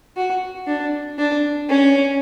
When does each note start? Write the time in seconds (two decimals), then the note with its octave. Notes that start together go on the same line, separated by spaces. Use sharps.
0.16 F#4
0.67 D4
1.18 D4
1.70 C#4